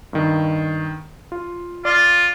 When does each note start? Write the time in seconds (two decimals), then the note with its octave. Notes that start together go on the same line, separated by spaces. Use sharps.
0.13 G2 D#3
1.32 F4
1.85 F4 D5